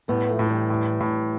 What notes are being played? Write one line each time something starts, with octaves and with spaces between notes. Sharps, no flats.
A2 G3 B3
F3 A3
A2
E3 G3
A2
A2